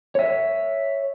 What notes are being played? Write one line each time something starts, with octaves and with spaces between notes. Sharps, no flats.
C#5 E5